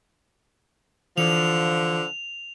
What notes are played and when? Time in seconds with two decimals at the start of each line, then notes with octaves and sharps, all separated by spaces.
1.18 D3 E3 F3 F7